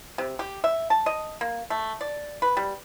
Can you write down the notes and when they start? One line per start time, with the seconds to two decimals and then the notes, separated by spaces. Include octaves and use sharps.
0.18 C3
0.39 G4
0.64 E5
0.90 A5
1.06 D#5
1.41 A#3
1.70 A3
2.01 D5
2.42 B4
2.57 G3